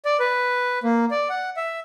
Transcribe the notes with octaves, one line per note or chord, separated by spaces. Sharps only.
D5
B4
A#3
D5
F#5
E5